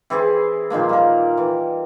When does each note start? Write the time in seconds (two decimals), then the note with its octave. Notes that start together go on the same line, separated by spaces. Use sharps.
0.10 E3 C4 E4 G#4
0.70 A#2 D#3 F3 A#3
0.89 G3 A#4
1.37 E3